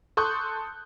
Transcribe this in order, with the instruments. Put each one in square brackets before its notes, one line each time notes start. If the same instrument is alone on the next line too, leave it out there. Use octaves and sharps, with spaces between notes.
[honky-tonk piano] A4 C6 C#6 D#6 F#6 G6